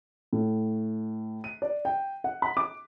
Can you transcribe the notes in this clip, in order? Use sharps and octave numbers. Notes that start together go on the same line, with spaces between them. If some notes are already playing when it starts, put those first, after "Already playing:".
A2
D#7
D5
G5
F#5
B5
D6